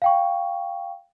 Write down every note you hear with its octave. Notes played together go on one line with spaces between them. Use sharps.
F5 G5 C#6